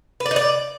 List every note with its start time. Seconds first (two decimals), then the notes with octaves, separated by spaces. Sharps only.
0.20 B4
0.26 D5
0.31 D#4
0.36 D5